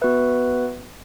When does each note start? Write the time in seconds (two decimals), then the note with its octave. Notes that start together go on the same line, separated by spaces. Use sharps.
0.01 B3 F#4 B4 E5